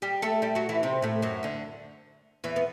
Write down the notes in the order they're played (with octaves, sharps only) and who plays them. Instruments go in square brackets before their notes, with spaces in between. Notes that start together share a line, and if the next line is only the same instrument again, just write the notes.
[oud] G3 G4
A3 A4
G3 G4
F#3 F#4
E3 E4
C3 C4
A2 A3
F#2 F#3
D2 D3
E2 E3
B3